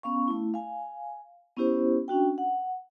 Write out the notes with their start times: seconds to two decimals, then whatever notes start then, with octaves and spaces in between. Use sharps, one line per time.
0.03 B3 C#4 F5 C#6
0.28 A3 E4
0.54 F5 G#5
1.57 B3 C#4 E4 G4 C5
2.08 C#4 D4 F#4 G5
2.38 F#5